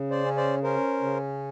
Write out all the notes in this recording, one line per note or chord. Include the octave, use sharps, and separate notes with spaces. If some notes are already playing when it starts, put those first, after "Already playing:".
Already playing: C#3
C5 D5
C#4
C5 D5
C#4 A#4 C5
C#3